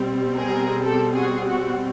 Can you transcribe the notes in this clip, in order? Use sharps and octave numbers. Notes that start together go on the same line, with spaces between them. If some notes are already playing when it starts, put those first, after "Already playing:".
Already playing: B2 G3 C4
G#4 A#4
G4 A4
F#4 G#4
F#4